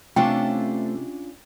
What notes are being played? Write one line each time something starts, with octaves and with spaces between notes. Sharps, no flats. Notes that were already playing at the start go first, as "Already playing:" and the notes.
C3 A3 C#4 D4 F4 A4 C5 G5